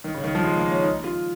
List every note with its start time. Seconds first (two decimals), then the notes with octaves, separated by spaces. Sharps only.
0.04 D#3
0.14 C#3
0.24 D#3
0.35 F3
0.44 G#3
0.57 A#3
0.70 C#4
0.84 D#4
1.04 F4